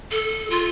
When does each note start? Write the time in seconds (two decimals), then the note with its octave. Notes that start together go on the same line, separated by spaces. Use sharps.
0.11 A4
0.50 F4